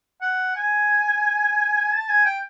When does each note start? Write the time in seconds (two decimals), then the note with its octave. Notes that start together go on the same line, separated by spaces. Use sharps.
0.22 F#5
0.56 G#5
1.91 A5
2.08 G#5
2.25 G5